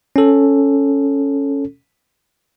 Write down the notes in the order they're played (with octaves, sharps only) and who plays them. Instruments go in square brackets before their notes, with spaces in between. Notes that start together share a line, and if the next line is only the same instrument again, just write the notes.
[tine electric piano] C#4 A4